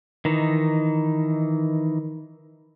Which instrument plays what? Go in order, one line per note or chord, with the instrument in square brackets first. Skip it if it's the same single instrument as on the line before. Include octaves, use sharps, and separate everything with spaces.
[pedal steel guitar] D#3 E3 D#4